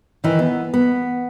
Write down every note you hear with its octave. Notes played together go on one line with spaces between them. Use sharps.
D#3 E3
B3
B3